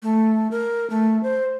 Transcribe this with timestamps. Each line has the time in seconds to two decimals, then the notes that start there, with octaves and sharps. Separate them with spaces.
0.03 A3
0.51 A#4
0.90 A3
1.23 C5